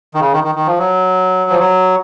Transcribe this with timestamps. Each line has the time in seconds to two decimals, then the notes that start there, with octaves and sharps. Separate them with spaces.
0.14 D#3
0.20 C#3
0.32 D#3
0.44 D#3
0.55 D#3
0.67 F3
0.78 F#3
1.50 F3
1.59 F#3